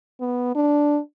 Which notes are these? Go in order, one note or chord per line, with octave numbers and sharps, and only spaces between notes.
B3
D4